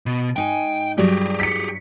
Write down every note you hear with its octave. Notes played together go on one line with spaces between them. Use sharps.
B2
G#2 D#4 G5 G#5
G2 F#3 G3 G4 G#4
B6 C#7